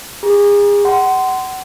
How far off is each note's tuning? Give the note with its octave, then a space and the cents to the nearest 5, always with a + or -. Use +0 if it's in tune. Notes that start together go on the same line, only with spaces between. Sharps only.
G#4 -35 A#5 +30
F#5 +25 C6 -15